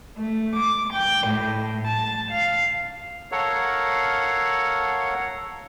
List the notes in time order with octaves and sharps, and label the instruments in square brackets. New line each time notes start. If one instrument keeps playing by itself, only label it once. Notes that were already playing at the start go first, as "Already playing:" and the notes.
[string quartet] A3
D6
G5
A2
A5
F5
[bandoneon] A4 A#4 C#5 F5 F#5